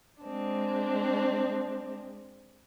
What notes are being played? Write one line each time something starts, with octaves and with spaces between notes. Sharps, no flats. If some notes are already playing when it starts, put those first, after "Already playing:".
G#3 C4 D4